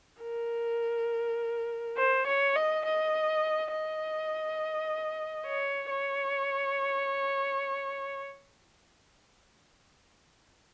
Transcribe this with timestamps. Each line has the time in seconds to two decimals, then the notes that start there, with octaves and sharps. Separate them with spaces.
0.22 A#4
1.97 C5
2.27 C#5
2.56 D#5
2.85 D#5
3.72 D#5
5.46 C#5
5.90 C#5